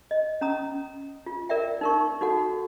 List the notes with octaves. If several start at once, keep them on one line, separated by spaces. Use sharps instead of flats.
D#5
C#4 A#5 D#6
F4
A#4 D5 E5 G5
D#4 A#4 C#6
D#4 F#4 A4 F#5